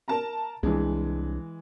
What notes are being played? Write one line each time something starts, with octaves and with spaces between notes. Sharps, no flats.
A#4 A5 A#5
C2 E3 G#3 D4